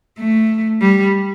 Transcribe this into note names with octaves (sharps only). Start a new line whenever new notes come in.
A3
G3